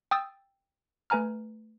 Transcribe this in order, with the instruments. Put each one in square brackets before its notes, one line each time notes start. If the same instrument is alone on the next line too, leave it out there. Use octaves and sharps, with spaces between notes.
[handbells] G5 D#6 E6 A6
A3 B4 G#5 A#5 F6